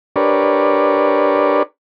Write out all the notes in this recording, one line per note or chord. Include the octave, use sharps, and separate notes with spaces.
D4 G4 A#4 B4 C#5 D5